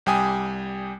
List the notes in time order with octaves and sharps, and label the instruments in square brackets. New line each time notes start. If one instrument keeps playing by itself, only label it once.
[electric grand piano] C2 G3 G5 G#5 D#6